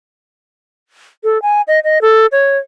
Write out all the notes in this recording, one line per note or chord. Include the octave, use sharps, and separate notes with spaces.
A4
G#5
D#5
D#5
A4
C#5